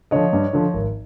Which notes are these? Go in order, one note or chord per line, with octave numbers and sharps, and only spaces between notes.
D3 F3 C#5 D#5
G2
D3 F3
G#1